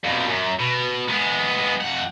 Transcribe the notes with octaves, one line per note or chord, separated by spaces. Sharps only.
F2 B2
F#2
B2
G#3 B3
F2 F#5